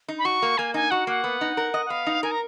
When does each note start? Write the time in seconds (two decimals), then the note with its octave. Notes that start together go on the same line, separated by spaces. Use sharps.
0.08 D#4
0.19 B5
0.25 F#4 C#6
0.42 A#3
0.58 A#3 G#5
0.74 D#4 G#5
0.91 F#4 F#5
1.07 A#3 F#5
1.24 B3
1.41 D#4
1.57 A#4
1.74 D#5
1.86 F#5
1.90 B3 F5
2.07 D#4
2.23 A#4 G#5
2.31 A#5